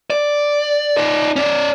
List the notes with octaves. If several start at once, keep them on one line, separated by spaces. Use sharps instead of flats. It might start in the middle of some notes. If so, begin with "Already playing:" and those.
D5
D#4 D5
C#4 D5